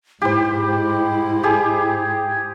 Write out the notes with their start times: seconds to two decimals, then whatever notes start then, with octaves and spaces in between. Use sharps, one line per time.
0.22 G#2 E4 G4 C5
1.43 G4 G#4